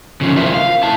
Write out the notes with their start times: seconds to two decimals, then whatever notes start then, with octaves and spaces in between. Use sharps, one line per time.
0.21 C#3 F3
0.37 F4 A#4 C5 E5
0.54 F5
0.83 E4 A5